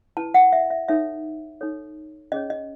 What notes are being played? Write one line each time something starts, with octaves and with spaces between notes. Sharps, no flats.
E4 B4 A5
F#5
E5
E5
D#4 A4 C#5 E5
D#4 A4 C#5
C#4 G#4 C#5 D#5
D#5